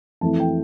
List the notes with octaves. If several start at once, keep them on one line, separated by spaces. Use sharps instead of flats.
F2 E3 A3 A5
G5